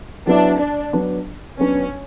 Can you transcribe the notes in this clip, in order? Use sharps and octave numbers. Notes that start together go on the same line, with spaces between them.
F#3 B3 D4 E4
D4
F#3 B3 D4
F#3 B3 C#4 D4